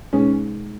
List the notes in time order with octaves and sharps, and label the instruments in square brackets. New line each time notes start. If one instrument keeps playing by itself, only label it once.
[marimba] B2 G#3 D#4 G#4 B4 [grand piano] C#4